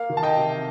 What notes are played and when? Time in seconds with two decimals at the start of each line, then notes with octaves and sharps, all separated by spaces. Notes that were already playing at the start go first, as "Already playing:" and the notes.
Already playing: A#3 F5
0.10 D#3
0.17 A5
0.23 D#5 G5
0.37 C3